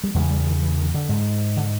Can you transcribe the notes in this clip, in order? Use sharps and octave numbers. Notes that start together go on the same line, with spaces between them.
G3
E2 C#3 G#3
G3
D#3
E3
D#3
D3
G#2
D3